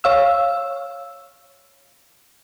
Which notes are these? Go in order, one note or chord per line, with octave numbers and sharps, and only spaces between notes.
C#5 F5 E6